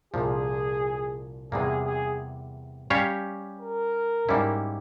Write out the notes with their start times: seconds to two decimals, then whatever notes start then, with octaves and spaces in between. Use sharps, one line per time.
0.14 C2 A#2 F3 G#4
1.52 E2 C3 G3 A#3 G#4
1.86 G#4
2.90 G3 C#4 G4 C#5 F5
3.60 A#4
4.29 G#2 G3 A#3 C#4 E4